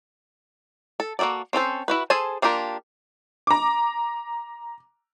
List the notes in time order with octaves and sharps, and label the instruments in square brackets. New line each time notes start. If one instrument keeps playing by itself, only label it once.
[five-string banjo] A4
A#3 F#4 G#4 A4 D5
C4 C#4 A4 C5
E4 F#4 B4
G#4 A4 C5 G#5 A5
A#3 D4 F4 G4 A#4
[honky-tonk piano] A#5 D6